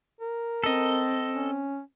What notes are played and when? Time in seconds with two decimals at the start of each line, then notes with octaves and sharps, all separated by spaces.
0.21 A#4
0.64 C4 A4 D#5
1.34 C#4